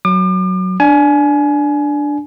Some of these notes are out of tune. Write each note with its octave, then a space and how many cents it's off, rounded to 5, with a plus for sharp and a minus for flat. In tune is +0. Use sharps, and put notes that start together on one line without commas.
F#3 +0 D6 +40
D4 +0 G#5 +25